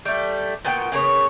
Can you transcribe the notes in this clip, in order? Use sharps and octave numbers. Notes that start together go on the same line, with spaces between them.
G3 A3
A#2 B3 F#4 G5
C#3 A#3 B3 C#5